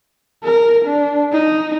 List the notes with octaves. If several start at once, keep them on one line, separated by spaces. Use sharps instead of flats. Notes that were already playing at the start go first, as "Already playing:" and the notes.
A#4
D4
D#4